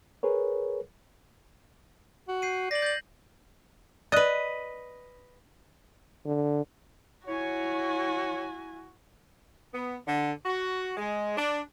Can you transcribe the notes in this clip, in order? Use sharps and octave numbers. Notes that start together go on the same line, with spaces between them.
G#4 A#4 B4 C#5
F#4
G6 C7 D#7
D5 A#6 F#7
G6 A6 F#7
B4 D5 D#5 D#6 F#6
D3
E4 F#4 C#5 G#5
B3
D3
F#4
G#3
D4